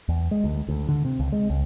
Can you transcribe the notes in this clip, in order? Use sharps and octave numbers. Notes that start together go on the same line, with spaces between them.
E2
G#3
D2
D2
D3
C3
C#2
G#3
C#2